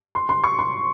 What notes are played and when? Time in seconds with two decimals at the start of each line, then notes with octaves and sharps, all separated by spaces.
0.15 C6
0.29 C6
0.44 C#6
0.59 C6